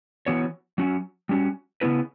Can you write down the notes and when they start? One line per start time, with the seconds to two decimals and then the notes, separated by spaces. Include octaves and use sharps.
0.26 E3 B3 F#4 C#5
0.78 F#3 C#4 F#4
1.29 G3 C#4 F#4
1.81 C#3 G3 B3 E4 B4